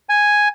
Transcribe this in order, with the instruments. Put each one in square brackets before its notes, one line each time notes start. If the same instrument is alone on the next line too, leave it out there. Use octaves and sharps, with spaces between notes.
[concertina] G#5